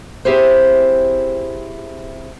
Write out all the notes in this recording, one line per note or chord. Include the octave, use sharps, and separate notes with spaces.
C4 E4 G4 G#4 C5